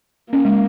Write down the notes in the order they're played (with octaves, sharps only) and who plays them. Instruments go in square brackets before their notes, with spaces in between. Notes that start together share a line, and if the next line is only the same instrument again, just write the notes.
[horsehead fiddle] A#3 [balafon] C#4
[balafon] G#3